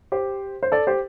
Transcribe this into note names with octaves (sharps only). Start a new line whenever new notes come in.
G4 C5
C5
A4 D5
G4 C5